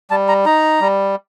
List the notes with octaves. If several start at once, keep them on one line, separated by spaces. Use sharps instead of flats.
G3 A5
A#5
D#4 A#5
G3